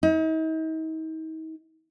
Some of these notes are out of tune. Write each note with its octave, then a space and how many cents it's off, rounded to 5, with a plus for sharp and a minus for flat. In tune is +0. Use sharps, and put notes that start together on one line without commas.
D#4 +40